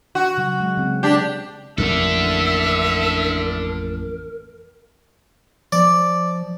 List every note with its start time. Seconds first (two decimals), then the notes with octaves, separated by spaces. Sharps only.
0.15 F#4
0.38 C#3 F#3
0.60 G#3
0.77 C#3 C4
1.03 D4 G4
1.78 A1 F2 A#3 D4 A4 A#4 E5
5.72 F3 D5